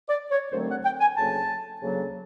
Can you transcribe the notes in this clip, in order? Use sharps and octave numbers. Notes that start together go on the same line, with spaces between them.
D5
C#5
D#2 D3 F#3 A3 C4 C5
F#5
G5
G#5
D2 C#3 F#3 A#3 A5
D2 C#3 F#3 A#3